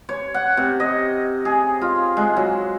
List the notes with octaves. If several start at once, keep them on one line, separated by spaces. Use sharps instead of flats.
C#5
F#5
C3
D#5
G#4
F4
G#3
F#3